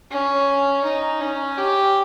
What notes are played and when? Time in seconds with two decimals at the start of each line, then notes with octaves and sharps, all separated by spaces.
0.11 C#4
0.84 D#4
1.21 C#4
1.58 G4